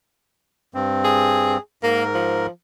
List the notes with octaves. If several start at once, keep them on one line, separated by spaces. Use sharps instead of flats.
G2 C4
G#4
G#2 A#3 A#4
F3